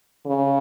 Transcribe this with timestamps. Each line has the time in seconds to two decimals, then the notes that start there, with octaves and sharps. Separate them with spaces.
0.26 C#3